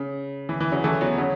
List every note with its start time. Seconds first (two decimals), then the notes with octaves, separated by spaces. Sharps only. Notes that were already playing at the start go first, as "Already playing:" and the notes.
Already playing: C#3
0.49 E3
0.60 E3
0.72 C#3 F#3
0.84 E3 A3
1.01 F#3 B3
1.18 C#3 F#3